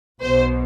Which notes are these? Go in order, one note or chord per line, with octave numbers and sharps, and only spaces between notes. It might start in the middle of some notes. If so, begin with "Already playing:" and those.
B1 B2 C5